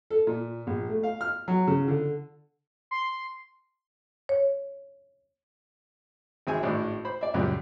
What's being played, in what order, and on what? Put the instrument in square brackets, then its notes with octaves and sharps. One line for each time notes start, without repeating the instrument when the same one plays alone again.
[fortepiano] A4
A#2
A#1
A3
F5
F6
F#3
C#3
D3
[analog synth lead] C6
[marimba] C#5
[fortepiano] G#1 C4 G#4 E5 G#5
G#1 A2 D4
C5 B5
D5 E5
C#2 F#2 A#2 G3